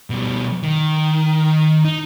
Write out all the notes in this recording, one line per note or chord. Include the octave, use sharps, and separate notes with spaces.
B2 G3
D#3
D#4